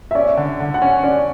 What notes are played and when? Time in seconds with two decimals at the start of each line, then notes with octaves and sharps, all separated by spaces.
0.11 E5
0.15 C#4 D5
0.37 D3
0.60 D3
0.74 F#5
0.82 C#4
1.03 C#4 D5